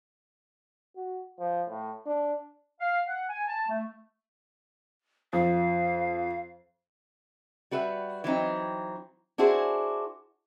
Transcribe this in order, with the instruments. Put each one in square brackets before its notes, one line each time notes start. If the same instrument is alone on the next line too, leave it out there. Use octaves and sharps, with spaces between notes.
[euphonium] F#4
F3
A2
D4
[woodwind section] F5
F#5
G#5
A5
A3
[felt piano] F2 [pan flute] F5
[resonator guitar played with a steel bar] G3 F#4 B4 E5
E3 F#3 C4 D#4
D4 E4 F#4 G#4 C5